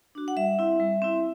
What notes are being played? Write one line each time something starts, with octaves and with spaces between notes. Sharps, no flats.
D4 F#4
F#5
G3 E5
C4 E4
G3
C4 E4